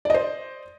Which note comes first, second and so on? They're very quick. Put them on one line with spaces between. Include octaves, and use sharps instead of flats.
D5 D#5 C5